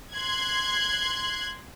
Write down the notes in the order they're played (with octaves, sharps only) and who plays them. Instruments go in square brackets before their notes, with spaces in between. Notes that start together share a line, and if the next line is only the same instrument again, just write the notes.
[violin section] C6 F#6 G#6